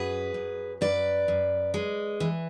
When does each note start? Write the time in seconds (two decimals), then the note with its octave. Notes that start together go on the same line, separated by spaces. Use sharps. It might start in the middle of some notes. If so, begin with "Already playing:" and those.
Already playing: F#2 G#4 B4
0.34 F#2
0.81 F#2 B4 D5
1.28 F#2
1.74 G#3
2.20 E3